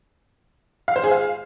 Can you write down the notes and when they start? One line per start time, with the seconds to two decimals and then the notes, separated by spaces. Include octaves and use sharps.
0.88 F5
0.96 C5
1.04 G#4
1.11 F5